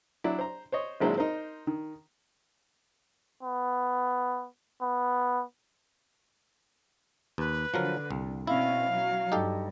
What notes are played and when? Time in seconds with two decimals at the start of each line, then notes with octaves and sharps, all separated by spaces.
0.24 F#3 D4 E4
0.38 C5 A#5
0.72 C5 C#5 D#5
1.00 G#1 A#2 F#3 G#3 E4 C5
1.18 D#4 A#4 C5
1.67 D#3
3.43 B3
4.81 B3
7.38 D#2 B4
7.74 D3 F3 F#3 A#4
8.11 C2
8.47 B2 C4 C#4 E4 F5
8.94 F#3
9.32 G2 D#4 G4 A4